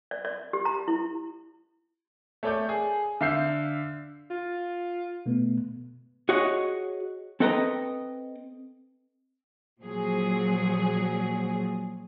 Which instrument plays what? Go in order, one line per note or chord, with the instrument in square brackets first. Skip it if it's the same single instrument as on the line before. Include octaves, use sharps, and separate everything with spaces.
[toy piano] D5
D5
G4
A#5
E4
[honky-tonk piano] A3 A4 C#5 D5 D6 G6
G#4
D3 E5 F5 E6 G6 C7
[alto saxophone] F4
[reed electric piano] B2 A3 B3
[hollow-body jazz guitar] F#4 G#4 C#5 D#5 F#5
C4 A4 B4 D#5 G5 A#5
[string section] A#2 F3 F#3 G#4